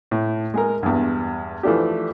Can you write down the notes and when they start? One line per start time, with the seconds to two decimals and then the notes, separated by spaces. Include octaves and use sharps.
0.11 A2
0.54 G#3 G#4 A#4
0.83 E2 G2
1.63 E3 F3 A3 D4 G4